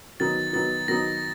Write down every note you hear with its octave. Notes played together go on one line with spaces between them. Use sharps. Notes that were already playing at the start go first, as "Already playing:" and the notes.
D#3 F#3 B3 D#4 A6
D#3 F#3 B3 D#4 A6
D#3 F#3 B3 D#4 A#6